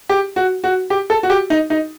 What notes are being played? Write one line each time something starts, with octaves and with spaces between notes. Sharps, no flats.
G4
F#4
F#4
G4
A4
F#4
G4
D#4
D#4